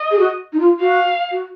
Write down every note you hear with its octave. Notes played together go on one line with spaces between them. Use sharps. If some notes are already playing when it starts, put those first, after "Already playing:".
Already playing: D#5
G#4
F#4
D#4
F4
F#4 F5
F#4